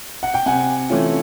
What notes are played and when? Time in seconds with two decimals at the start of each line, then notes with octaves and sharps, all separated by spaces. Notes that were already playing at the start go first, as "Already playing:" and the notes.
0.23 F#5
0.34 G5
0.46 C3 F#5 G#5
0.90 E3 A3 C#4 F4